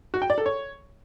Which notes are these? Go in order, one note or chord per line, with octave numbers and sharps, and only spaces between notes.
F#4
G5
D5
A4
C#5